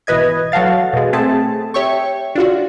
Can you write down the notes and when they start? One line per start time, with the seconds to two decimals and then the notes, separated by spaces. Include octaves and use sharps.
0.07 G#1 B2 E3 B4 D#5 G#6
0.52 F#3 F#4 A4 F5 A6
0.93 B2 G#3
1.13 A3 C4 G#4 A5
1.74 G4 C#5 E5 G5 C#6
2.35 D4 F4 F#4